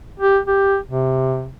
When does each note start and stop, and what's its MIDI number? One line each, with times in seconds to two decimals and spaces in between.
0.20 0.39 67
0.48 0.77 67
0.88 1.49 48